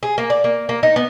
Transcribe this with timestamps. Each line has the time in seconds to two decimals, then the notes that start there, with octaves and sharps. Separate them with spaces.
0.03 G#4
0.18 A#3
0.30 D5
0.44 A#3
0.69 A#3
0.83 D#4
0.96 B3